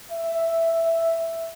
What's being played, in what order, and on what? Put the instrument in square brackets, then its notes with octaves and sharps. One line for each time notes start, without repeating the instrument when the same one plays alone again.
[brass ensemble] E5